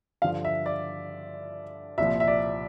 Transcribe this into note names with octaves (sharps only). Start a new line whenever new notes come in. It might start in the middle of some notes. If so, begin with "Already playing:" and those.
G2 D3 F3 F5
E5
D5
C2 A#2 F3 E5
E5
D5